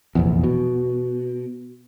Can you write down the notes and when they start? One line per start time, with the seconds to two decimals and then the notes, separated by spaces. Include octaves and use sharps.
0.15 F1 A#1 E2
0.44 B2